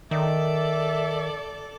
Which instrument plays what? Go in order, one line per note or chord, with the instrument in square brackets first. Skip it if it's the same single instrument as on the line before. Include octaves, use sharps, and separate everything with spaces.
[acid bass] D#3 [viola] A4 D5 [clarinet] E5